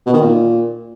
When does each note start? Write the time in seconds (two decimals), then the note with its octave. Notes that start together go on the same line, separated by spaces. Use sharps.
0.06 B2
0.14 D#3
0.21 A#2